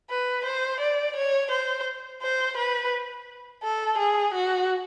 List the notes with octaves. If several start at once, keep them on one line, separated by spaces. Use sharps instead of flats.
B4
C5
D5
C#5
C5
C5
B4
A4
G#4
F#4